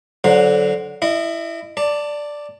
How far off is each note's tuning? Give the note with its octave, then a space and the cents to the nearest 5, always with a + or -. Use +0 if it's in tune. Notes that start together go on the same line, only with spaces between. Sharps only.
D3 -20 F#3 +0 C5 +0
E4 +10 D#5 -25
D5 +0 A5 +25